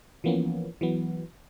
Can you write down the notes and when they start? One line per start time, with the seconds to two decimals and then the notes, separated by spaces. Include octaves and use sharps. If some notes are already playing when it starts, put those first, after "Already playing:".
0.24 E3 F3 A#3 B3 C#4
0.81 E3 F#3 B3